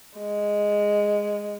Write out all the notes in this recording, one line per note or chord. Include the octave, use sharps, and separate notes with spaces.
G#3